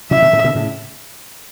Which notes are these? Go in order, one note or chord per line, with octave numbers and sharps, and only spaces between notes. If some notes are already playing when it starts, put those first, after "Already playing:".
C#3 E3 E5
B2 D3
A2 C#3
B2 D3
A2 C#3